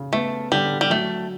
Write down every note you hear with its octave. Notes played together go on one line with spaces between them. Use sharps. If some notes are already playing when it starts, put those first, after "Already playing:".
Already playing: C#3
A3 B3
D3 G3
G3
F#3 A3